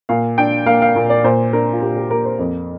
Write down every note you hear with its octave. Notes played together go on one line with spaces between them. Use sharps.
A#2 F5
D4 G5
A#3 F5
F5
A#2
D5
A#2 C5
D4 A#4
F4
A#2 G4
G4
A#3 A#4
C5
F2